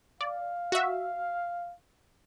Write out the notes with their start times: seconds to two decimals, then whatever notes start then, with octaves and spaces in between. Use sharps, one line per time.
0.21 D5 F5
0.72 F#4 E5